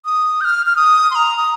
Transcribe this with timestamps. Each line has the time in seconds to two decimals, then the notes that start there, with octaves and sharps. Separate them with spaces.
0.05 D#6
0.41 G6
0.45 F6
0.66 F6
0.76 D#6
1.11 C6
1.15 A#5
1.37 D#6